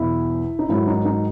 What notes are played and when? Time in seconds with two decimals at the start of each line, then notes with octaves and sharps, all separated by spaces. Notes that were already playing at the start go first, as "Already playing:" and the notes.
Already playing: E2 B2 F#3 E4
0.59 D#4
0.69 G#2 D#3 F#3 E4
0.87 D#4
1.05 D#4